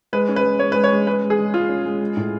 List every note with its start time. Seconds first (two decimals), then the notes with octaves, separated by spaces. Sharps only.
0.13 G#3 B4
0.28 C#4
0.36 B4
0.44 G#3
0.59 G#3 C#5
0.72 G#3 B4
0.84 C#5
0.92 G#3
1.07 G#3 B4
1.23 G#3
1.30 G#4
1.39 G#3
1.54 G#3 F4
1.69 C#4
1.85 G#3
2.00 G#3
2.16 A2